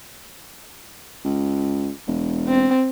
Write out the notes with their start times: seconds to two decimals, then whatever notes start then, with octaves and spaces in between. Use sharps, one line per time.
1.24 C#2
2.07 E1
2.48 C4